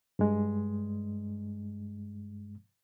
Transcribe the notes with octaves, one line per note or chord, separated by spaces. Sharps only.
G2 G#3